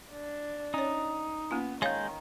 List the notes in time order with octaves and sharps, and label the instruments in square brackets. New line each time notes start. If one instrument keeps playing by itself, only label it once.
[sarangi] D4
[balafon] C#4 C#5 [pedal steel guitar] D#4
[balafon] A#3 C#4 F4 [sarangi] B3
[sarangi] D#3 [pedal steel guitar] G#3 G6 [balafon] C#5 F5